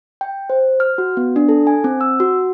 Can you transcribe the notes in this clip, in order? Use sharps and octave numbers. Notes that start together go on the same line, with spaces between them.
G5
C5
F6
F#4
B3
D4
A4
G#5
C4
E6
F#4